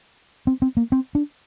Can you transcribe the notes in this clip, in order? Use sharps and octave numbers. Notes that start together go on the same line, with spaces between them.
C4
C4
A#3
C4
D4